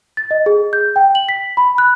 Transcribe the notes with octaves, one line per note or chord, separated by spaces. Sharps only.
A6
D#5
G#4
G6
G5
F#7
B6
B5
F#6